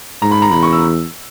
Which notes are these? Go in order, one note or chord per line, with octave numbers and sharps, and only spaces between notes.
G#2 A#5
B5
A#5
E2 B5
C#6
E6